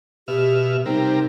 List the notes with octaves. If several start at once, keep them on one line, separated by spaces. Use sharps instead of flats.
B2 G4 E5 F6
C3 G3 D#4 A#4